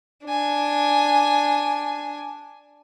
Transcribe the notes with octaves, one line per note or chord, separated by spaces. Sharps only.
D4 G#5